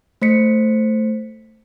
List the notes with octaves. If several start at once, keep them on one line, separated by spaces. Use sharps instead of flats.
A3 C5 B6 C#7